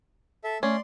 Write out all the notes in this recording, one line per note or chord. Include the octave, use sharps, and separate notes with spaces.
A4 E5
A3 C#4 D5 C6